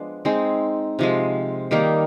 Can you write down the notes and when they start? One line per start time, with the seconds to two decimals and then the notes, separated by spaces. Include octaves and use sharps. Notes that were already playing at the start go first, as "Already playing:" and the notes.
Already playing: F3 G#3 B3 D4
0.25 G#3 C4 D#4
0.99 C3 F3 G#3
1.71 D#3 G3 A#3 D#4